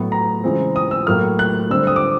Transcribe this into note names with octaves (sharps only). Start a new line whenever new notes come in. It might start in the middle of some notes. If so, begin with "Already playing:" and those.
Already playing: A2 F#3 B3
A#5
C#3 E3 G#3 C4
D#6
E6
A2 F#3 A#3 F6
F#6
D3 G3 C4 E6
D#6
D6